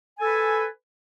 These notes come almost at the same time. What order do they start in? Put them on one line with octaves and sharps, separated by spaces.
G#5 A4 B4